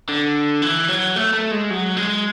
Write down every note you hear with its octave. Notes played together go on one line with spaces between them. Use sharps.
D3
E3
F#3
A3
A3
G#3
F#3
G#3